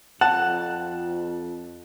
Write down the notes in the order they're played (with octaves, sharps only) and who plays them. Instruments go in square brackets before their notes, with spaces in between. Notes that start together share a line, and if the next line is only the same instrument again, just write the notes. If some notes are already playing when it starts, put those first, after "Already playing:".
[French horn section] F2 [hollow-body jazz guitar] F#5 [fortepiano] A5 [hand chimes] F#6